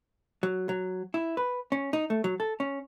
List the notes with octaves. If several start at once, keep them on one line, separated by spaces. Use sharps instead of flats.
F#3
F#3
E4
B4
C#4
D#4
A3
F#3
A4
C#4